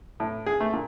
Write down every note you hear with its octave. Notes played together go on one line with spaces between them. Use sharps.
A2
G#4
A3
A#2